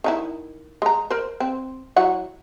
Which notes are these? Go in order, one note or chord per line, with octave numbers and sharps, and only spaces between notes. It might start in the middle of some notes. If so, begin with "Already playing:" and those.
D#3 D#4 E4
G#3 A#5
A#4 C5
C4
F#3 E4 F#5